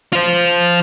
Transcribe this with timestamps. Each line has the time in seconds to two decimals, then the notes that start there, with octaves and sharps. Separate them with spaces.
0.13 F4 C5